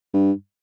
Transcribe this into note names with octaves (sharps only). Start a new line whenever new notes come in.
G2